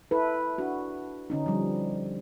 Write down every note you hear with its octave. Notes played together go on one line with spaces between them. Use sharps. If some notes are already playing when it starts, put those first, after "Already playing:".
E4 A4 B4
D4 F#4
D3 C#4 D#4
F3 G3